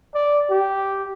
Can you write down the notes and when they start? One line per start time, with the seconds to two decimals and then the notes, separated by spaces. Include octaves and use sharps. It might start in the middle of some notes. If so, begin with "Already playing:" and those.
0.15 D5
0.50 G4